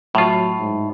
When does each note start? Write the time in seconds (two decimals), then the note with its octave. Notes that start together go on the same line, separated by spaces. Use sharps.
0.15 A2 F#3 F4
0.59 G#2